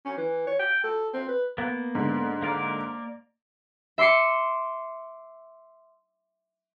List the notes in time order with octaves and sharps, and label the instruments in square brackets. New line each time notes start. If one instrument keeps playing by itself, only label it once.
[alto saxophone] C#4
E3
C#5
G5
A4
C4
B4
[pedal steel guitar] A#3 B3
[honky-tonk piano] G#2 D3
[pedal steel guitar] A#3 A#4 D5
[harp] E5 C6 D6 C7 C#7